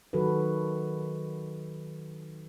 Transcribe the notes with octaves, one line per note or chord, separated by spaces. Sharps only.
D#3 F#3 F#4 A4 B4